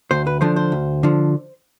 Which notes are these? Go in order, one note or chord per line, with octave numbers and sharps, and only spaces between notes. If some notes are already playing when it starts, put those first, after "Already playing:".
D2 C5
B4
D3 F3 C5
C5
D2
D3 F3